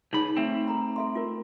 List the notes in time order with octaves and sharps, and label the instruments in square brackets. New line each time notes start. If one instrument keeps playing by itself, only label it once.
[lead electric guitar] C#2 B5 [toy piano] D#4 G#4 C#5
[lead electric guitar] A3 C4 [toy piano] G#5
[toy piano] A4 A#5 B5
A4 E5 C6
F4 A#4